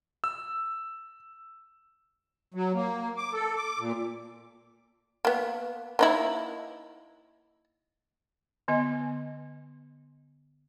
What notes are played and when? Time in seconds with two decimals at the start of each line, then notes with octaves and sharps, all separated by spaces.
0.24 E6
2.54 F#3
2.74 A#3
3.17 D6
3.33 A4
3.56 D6
3.79 A#2
5.25 A#3 B3
5.99 A#3 D#4 E4
8.68 D3 B3 D#5